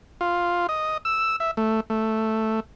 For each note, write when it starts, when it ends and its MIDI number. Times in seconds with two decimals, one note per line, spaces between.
0.21 0.67 65
0.69 0.97 75
1.05 1.36 88
1.40 1.51 76
1.57 1.80 57
1.90 2.60 57